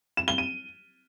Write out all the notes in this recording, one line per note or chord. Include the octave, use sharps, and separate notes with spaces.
E7
G7
D#7